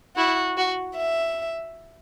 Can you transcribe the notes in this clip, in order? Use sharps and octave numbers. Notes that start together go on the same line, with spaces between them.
E4 F#4
F#4
E5